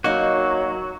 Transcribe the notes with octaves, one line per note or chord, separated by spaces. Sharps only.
F#3 A#3 D#4 F#4 C#5